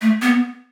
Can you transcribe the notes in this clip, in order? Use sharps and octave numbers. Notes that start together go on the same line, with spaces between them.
A3
B3